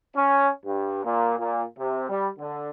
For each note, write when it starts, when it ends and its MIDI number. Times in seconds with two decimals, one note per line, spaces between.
0.15 0.49 61
0.65 1.00 43
1.05 1.34 46
1.39 1.62 46
1.78 2.06 48
2.09 2.28 55
2.39 2.70 50